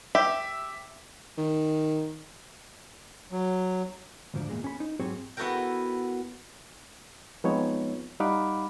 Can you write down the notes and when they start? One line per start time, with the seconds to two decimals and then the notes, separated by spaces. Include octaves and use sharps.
0.15 G4 E5
1.38 D#3
3.32 F#3
4.34 D2 G#2 F3 D4
4.49 E2 A#2 G#3
4.64 C#4 B5
4.80 D#4
5.00 G#2 F#3 C4 G4 G#4 C#5
5.37 B3 E4 F#4 A4 A#4 G5
7.44 F3 G#3 B3 C4 D#4 C#5
8.20 G3 D#4 F5 F#5 B5 D6